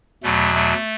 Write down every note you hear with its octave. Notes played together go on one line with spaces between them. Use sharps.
E2 B2 F#3 A3
A3